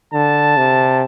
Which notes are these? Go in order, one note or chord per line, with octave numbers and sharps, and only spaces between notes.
D3 A5
C3